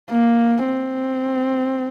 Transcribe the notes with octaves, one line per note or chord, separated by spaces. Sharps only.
A#3
C4